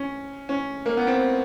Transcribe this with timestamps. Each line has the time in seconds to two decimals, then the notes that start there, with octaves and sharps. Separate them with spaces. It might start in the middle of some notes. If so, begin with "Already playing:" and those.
Already playing: C#4
0.49 C#4
0.86 A#3
0.97 B3
1.07 C4